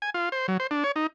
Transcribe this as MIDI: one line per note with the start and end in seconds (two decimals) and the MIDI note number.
0.02 0.10 80
0.14 0.29 65
0.32 0.47 72
0.48 0.57 54
0.60 0.67 72
0.71 0.84 62
0.84 0.92 73
0.96 1.07 63